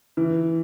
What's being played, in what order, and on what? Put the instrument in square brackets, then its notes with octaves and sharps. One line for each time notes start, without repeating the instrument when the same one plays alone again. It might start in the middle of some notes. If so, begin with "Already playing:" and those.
[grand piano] E3